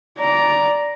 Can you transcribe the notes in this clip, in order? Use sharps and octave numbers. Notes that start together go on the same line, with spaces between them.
D5 A#5